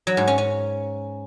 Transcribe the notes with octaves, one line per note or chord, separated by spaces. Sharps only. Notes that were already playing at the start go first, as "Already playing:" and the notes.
F#3
G#2
C#4
C#4